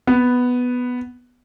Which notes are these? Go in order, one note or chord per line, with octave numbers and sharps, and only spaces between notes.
B3